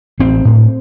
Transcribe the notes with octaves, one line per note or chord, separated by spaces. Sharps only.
A1 C4
A2